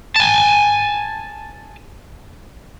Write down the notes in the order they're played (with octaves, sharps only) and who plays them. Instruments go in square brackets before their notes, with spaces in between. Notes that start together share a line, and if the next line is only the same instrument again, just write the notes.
[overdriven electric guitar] G#5 A5